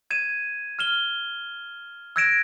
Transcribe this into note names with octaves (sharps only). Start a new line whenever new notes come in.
G#6 D#7 E7
F6 E7 G7
E6 F#6 G#6 A#6 D7 E7